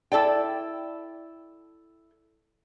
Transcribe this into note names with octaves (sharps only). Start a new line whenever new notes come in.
E4 A4 D5 G5